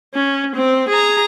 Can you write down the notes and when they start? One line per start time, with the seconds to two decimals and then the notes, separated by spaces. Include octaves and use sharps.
0.14 C#4
0.55 C4
0.89 G#4 A#5